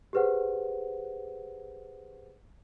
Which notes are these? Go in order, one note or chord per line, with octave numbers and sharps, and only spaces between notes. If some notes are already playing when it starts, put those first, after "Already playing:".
G4 G#4 B4 C5 F#5